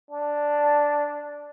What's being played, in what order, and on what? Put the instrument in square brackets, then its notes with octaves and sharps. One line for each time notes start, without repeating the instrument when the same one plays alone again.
[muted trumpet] D4